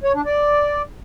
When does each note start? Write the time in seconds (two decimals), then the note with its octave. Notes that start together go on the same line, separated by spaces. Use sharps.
0.03 C#5
0.14 D4
0.25 D5